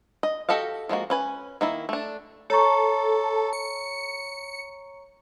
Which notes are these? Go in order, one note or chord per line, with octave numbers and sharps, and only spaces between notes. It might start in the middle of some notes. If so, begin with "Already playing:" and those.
D#5
F#4 G4 A4 D#5 F5
F3 G#3 A#3 F#4
C#4 B4 G#5
D#3 A#3 E4
A3 D4
A4 C#5 A#5 C#6
C#7